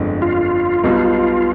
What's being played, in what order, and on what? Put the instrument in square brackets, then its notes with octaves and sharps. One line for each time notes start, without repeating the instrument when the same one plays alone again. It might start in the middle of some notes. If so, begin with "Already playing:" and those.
Already playing: [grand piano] G1 F2 D3 G#3
[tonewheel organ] F4
[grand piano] B1 B2 G3 B3